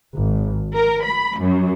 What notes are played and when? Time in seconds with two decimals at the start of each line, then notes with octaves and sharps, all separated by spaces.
0.14 G#1
0.75 A#4
1.04 B5
1.40 F#2